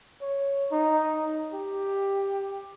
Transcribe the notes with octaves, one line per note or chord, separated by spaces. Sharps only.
C#5
D#4
G4